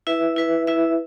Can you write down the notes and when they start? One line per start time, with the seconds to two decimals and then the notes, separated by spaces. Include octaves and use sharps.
0.07 E4 B4 E5
0.36 E4 B4 E5
0.67 E4 B4 E5